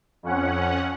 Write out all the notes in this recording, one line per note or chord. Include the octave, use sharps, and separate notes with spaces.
F2 C#4 F#5